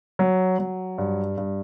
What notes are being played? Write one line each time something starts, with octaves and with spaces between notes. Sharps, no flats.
F#3
F#3
G2
G2